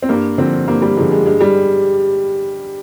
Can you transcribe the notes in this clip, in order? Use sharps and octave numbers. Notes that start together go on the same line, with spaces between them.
C4
G2 A#3
D3 F3 C4
G2 A#3
G3
D3 F3 G#3
G#3
G2 G#3
G3